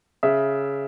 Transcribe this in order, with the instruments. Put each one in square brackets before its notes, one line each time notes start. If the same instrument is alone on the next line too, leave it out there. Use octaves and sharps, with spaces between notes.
[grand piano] C#3 E5